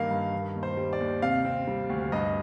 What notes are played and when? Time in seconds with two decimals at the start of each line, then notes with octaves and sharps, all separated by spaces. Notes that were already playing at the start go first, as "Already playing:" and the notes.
Already playing: G2 D#3 A#3 F5
0.11 G2
0.33 D#3
0.55 D#2
0.63 C5
0.77 G3
0.93 D5
1.00 D#2
1.22 C3 F5
1.45 C4
1.68 G3
1.90 D2
2.12 G2 D#5